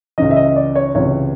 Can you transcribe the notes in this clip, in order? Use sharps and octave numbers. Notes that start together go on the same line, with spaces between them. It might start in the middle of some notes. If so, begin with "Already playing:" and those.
C#2 C#3 E3 D#5
E5
D#5
D5
C#5
C#2 C3 E3 C#5